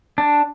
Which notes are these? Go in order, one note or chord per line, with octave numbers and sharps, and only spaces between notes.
D4